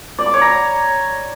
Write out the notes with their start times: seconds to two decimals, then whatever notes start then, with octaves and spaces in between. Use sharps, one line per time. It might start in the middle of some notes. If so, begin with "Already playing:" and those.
0.18 D5
0.26 D6
0.34 C#5
0.41 A#5